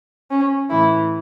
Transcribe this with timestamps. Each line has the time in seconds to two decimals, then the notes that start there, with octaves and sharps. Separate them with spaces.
0.31 C#4
0.69 A2 E3 E4